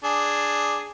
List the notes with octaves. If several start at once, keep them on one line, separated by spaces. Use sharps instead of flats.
D4 G#4